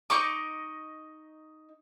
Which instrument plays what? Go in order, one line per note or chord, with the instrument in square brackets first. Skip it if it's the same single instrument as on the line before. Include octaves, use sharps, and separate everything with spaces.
[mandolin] D#4 D#5 C#6 D6